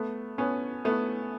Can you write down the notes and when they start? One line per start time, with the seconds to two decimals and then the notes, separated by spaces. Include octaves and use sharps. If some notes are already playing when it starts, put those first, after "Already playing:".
Already playing: A3 B3
0.38 B3 C#4
0.85 A3 B3